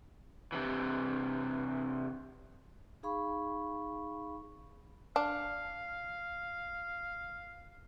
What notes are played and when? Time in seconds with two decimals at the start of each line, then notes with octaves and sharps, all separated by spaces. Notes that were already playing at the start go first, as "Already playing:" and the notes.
0.52 C3 E3
3.03 D#4 G#4 F5 B5 C#6
5.16 D4 F5